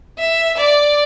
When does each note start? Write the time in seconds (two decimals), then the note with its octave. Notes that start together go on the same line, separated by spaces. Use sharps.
0.19 E5
0.58 D5